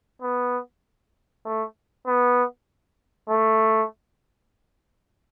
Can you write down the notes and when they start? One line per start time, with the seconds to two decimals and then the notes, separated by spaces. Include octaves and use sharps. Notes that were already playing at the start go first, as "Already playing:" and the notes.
0.22 B3
1.45 A3
2.07 B3
3.29 A3